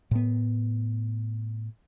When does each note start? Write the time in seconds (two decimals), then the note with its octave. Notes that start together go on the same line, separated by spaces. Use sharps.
0.11 A2 B3